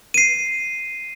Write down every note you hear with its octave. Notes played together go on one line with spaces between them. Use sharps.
C7 D#7